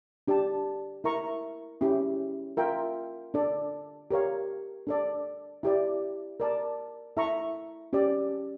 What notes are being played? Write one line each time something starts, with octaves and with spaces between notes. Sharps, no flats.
D4 G4 D5 A5
E4 A#4 E5 A#5 C#6
C#4 E4 G4
F4 A#4 E5 G5
D4 A4 D5
G4 A#4 C#5 F5
D4 A4 D5
E4 G4 D5
A#4 D5 A5
E4 A4 E5 A#5 C#6
C#4 G4 D5